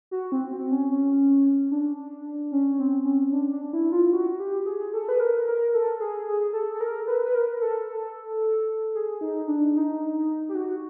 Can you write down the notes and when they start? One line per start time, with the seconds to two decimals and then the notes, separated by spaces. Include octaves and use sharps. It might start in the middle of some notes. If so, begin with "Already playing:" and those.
0.11 F#4
0.32 C4
0.52 C4
0.71 C#4
0.91 C#4
1.71 D4
2.52 C#4
2.79 C4
3.05 C#4
3.32 D4
3.52 D4
3.73 E4
3.92 F4
4.13 F#4
4.40 G4
4.66 G#4
4.93 A4
5.09 B4
5.20 A#4
5.46 A#4
5.74 A4
6.00 G#4
6.27 G#4
6.53 A4
6.74 A4
6.81 A#4
7.07 B4
7.25 B4
7.35 A#4
7.61 A4
7.88 A4
8.95 G#4
9.21 D#4
9.48 D4
9.75 D#4
10.49 G4
10.55 F#4